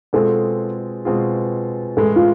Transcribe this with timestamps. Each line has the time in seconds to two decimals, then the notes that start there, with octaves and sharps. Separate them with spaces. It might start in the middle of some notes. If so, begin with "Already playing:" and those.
0.13 B2 G#3 C4 F4 G#4 A4
1.05 B2 G#3 C4 F4 G#4
1.97 A2 E3 G#3 A4
2.16 F4